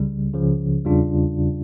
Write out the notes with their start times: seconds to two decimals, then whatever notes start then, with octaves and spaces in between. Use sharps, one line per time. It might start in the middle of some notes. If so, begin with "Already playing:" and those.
Already playing: C#2 C#3 G3
0.34 C#2 C#3 F3
0.85 E2 C#3 G3 D4 F4